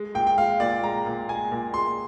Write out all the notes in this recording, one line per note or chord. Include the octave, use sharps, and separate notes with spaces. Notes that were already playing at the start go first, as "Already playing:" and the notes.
Already playing: G#3
A#2 G5
G5
G#3 F5
A#2 D5
G#3 A#5
A#2
G#3 G#5
A#2
G#3 C6